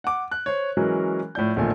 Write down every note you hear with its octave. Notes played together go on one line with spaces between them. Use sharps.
F#5 D6
F#6
C5 C#5
E3 F#3 G#3 C#4 F#4 A#4
A2 F3 D5 G6
A#1 E2 D#3 F3 A3 G#5